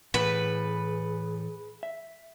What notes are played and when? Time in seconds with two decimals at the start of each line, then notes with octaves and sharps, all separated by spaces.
0.14 A2 E3 G#4 B4 F#5
1.83 E5